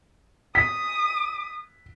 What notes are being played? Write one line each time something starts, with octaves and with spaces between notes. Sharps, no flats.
D#6 B6